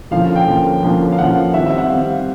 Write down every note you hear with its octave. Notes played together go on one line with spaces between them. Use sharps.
D3 F3 A#3 C#4 F5
G5
D3 F3 A#3 C#4
D3 F3 A#3 C#4
F5
D3 F3 A#3 C#4 F#5
D#3 G3 C4 E5
E5
F#5
D#3 G3 C4 F5